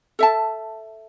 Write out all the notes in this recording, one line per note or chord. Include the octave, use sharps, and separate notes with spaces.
A4 E5 A5